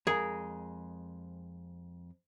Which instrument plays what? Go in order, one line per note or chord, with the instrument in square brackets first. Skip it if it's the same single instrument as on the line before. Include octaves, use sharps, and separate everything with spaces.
[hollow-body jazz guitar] F2 G#3 A#4 [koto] G#4